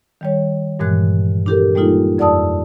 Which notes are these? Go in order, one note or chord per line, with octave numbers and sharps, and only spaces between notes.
D#3 G3 C#5
G2 A#2 E3 G#3 F#6
D4 E4 G4 A4 A#4
G3 G#3 A#3 D#4 F4 A4
F2 D5 F#5 A5 D#6 E6